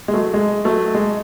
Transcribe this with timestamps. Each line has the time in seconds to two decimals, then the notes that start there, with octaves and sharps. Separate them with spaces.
0.08 G#3
0.13 F#3 A3
0.34 G#3
0.65 F#3 A3
0.95 G#3